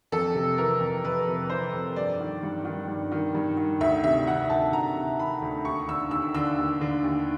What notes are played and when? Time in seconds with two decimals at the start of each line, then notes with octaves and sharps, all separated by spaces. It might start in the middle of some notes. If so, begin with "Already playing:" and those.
0.12 F2 A4
0.35 C3
0.58 E3 A#4
0.80 F2
1.04 F2 B4
1.28 C3
1.50 E3 C5
1.73 F2
1.96 G2 D5
2.20 D#3
2.43 G2
2.65 D#3
2.88 G2
3.12 D#3
3.35 G2
3.57 D#3
3.80 D2 E5
4.04 C3 E5
4.27 D#3 F#5
4.50 D2 A5
4.72 D2 A#5
4.96 C3
5.19 D#3 B5
5.42 D2
5.65 D#2 C#6
5.88 D3 E6
6.11 D#2 E6
6.34 D3 E6
6.58 D#2
6.81 D3
7.04 D#2